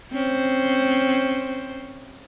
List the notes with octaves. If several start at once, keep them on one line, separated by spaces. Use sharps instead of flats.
C4 C#4 C5